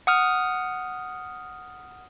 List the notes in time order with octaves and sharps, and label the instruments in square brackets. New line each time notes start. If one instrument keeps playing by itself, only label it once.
[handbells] F#5 D#6 F6